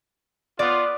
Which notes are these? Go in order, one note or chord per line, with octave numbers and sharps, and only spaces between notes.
B3 F4 D5